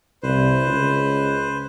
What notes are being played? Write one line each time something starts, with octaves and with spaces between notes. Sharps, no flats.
C2 B4 C5
C#2